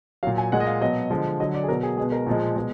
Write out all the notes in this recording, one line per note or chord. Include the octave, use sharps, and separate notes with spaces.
A#2 F#3 F5
G#5
A#2 G#3 F#5
D#5
F5
B2 F#3 D#5
D3 F3 G#3
D3 F#3 D#5
D5
G#4
B2 F#3 A#4
G#4
B2 G#3 G#4
A#4
A#2 F3 G#3
B2 G#3